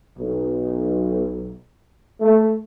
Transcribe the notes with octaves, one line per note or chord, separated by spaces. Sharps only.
B1
A3